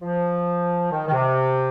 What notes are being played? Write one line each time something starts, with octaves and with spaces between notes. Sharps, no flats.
F3
D#3
D#3
C3